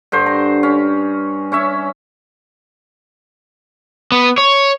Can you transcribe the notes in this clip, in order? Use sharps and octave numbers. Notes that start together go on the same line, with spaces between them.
G2 D3 C5 C#6
A#5
C#4
C#4 C#5 E5
B3
C#5